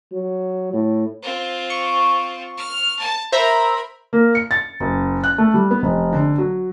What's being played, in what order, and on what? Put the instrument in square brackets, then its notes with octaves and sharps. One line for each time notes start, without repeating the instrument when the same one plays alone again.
[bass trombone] F#3
A2
[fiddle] C4 F4
[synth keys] C#6
[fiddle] F6
A5
[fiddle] A#4 B5 [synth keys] C5 E5 A#5
[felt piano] A#3
C#7
A6
F#1
F#6
A3
G3
B3
F1
D3
F#3